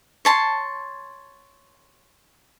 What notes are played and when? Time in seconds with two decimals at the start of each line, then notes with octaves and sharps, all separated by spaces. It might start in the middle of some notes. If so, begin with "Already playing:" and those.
0.25 C#5 A5 C6